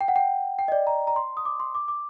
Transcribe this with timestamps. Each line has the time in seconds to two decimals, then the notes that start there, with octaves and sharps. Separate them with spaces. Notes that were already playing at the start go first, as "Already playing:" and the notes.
0.01 G5
0.08 F#5
0.16 G5
0.59 G5
0.68 D#5
0.72 D5
0.87 A#5
1.07 A#5
1.16 C6
1.37 D#6
1.45 D6
1.60 C6
1.75 D6
1.88 D6